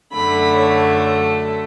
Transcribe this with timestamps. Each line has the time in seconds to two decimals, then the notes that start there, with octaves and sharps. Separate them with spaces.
0.12 F#2 D3 A3 B5
0.56 C#5
0.98 A4